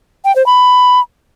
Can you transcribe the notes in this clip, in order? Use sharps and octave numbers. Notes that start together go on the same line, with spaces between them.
G5
C5
B5